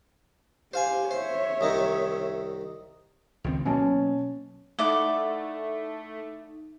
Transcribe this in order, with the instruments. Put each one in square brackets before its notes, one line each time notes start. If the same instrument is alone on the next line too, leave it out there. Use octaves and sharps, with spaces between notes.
[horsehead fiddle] G4 [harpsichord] C5 F5 G#5
[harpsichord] C5 [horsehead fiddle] C#5 E5
[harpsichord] C2 D#3 D#4
[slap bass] C#2 D#3 C4
[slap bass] B2 F#3 A#3 [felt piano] C#4 A5
[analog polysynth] A3 [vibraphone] D#4 [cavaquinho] E4 D5 F#5